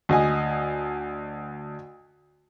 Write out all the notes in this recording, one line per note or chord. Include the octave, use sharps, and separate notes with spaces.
D2 D#5 G#5